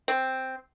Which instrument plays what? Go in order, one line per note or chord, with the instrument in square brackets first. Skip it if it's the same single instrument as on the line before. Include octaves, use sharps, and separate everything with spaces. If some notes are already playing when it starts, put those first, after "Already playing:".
[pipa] C4